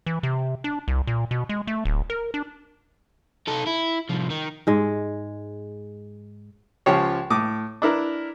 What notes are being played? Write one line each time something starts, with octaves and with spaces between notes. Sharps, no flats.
E3
C3
D4
C2
A#2
B2
G#3
A3
D1
A#4
D4
D#4 A4
E4
C2 F3
D#3
G#2 G#3
C#2 F3 G4 C#5
A2 D6 D#6
D4 E4 A#4 B4